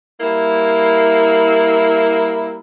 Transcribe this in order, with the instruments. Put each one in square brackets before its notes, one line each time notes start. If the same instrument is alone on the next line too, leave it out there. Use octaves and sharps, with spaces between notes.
[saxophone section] G3 A#3 E4